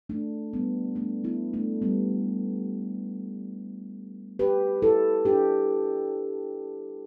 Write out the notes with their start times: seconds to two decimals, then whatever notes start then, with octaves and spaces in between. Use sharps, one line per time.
0.09 A3 D4
0.53 G3 B3
0.95 A3 D4
1.24 B3 E4
1.53 A3 D4
1.82 G3 B3
4.39 G4 B4
4.82 E4 A4
5.25 D4 G4